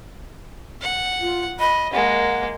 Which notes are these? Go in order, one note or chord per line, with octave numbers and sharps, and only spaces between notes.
F#5
F4
D#5 B5
G#3 A#3 F#5